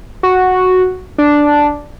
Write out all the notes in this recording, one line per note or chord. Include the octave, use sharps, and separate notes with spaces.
F#4
D4